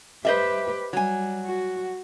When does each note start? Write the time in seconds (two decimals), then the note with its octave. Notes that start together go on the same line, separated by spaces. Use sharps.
0.25 G4 B4 C5 D#5 E5
0.93 F#3 G3 G#5
1.44 F#4